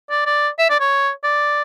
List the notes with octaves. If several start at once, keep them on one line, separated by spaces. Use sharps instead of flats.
D5
D5
E5
D5
C#5
D5